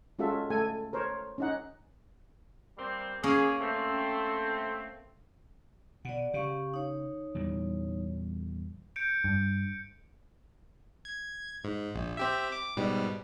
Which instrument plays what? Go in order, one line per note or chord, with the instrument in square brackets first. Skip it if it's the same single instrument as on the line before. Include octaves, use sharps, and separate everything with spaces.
[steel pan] G#3 C#4 F4 F#4 A4 E5
A3 A4 G#5
A#4 C5 C#5
C#4 D#4 F#5
[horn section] G3 A#3 C4
[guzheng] A#3 C#4 [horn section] G#4
[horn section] A3 C4
[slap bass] B2 [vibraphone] D5 F#5
[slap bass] C#3 [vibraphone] G4 F5 C#6
[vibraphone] D#4 C#5
[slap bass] E2 A#2 G3
[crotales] G6 C#7 D7
[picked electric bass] G2
[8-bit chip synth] G#6
G#2
A#1
C4 G4 E5
D6
G#2 B2 G3